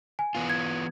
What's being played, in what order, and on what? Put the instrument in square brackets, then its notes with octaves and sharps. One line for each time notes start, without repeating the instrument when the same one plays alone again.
[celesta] G#5
[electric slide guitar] E3 B3 F4
[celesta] G#6